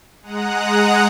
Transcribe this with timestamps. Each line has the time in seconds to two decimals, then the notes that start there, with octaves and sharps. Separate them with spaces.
0.22 G#3 F#5 A#5 D#6 F#6